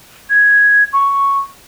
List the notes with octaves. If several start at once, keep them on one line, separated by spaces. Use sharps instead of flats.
G#6
C#6